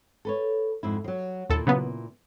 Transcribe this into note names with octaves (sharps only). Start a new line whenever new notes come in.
A4 B4 C#5
F2 G#2 E4
F3 F#3
D#2 A#2 E4 A4
C#3 F#3 B3